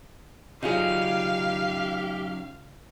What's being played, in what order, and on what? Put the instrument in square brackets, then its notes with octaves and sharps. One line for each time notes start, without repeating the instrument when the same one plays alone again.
[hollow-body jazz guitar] C#3 F4 G#4 [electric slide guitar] F#3 C#4 D#4 [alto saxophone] G4 [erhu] F5